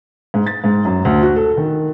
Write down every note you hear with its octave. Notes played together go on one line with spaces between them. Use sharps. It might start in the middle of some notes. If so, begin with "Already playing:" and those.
G#2
A6
G#2
F#2
D2
F#4
A4
D#3